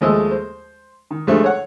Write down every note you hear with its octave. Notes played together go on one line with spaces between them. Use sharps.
D#2 F3 G#3 A3 D#5 E6
C5
D#3
G2 F3 G#3 A3
C#5 F#5